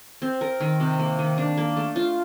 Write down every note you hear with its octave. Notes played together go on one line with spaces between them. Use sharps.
C4
A#4
D#3
C3
A#3
D#3
D4
A#3
A3
F4